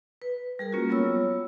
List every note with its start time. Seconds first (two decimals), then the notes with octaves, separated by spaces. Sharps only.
0.22 B4
0.59 G3 G#4 A#4
0.72 A#3 C#4 F4 F#4
0.89 F#3 G3 B3 F4 C#5 E6